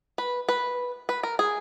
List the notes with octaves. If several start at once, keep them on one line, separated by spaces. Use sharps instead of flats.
B4
B4
B4
A#4
G#4